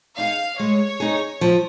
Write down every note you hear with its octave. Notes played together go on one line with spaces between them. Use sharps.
D#4 G#4 F5
G#3 C#5
D#4 G#4
F3